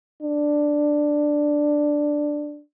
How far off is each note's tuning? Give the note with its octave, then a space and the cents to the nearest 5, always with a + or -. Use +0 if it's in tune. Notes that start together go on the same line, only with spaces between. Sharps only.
D4 +5